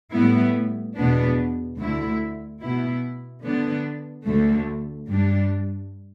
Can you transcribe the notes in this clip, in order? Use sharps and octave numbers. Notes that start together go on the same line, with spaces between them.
A2 G3 B3 E4
E2 B2 B3 D4
D2 D3 A3 E4
B2 B3 E4
D3 B3 D4
D2 D3 A3
G2 G3 D4